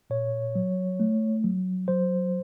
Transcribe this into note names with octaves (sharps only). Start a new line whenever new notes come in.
A#2 C#5
F#3
A3
F#3
F#3 C5